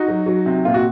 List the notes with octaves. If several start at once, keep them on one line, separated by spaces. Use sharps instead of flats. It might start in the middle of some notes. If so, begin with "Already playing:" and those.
Already playing: D#4 F#4
F#3
F#3
C3
A#2 F4
F#4